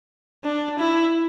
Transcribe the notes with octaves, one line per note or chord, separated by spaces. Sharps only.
D4
E4